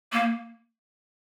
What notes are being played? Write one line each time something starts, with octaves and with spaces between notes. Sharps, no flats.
A#3